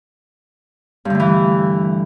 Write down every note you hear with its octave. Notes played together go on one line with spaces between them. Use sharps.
G2 D3 E3 A3